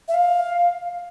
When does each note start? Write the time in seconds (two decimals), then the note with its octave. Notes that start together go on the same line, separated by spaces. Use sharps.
0.08 E5
0.14 F5